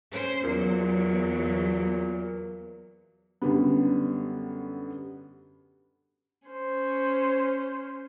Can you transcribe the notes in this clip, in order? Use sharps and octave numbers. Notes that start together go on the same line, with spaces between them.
C#4 C5
E2 A#2 F#3
F#2 D3 G3 B3
C#4 C5